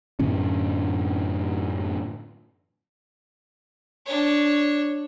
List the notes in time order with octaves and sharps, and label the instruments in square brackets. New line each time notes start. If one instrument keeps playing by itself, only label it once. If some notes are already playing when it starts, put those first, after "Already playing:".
[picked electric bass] F#2 A2 D3 C#4
[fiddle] D4 C#5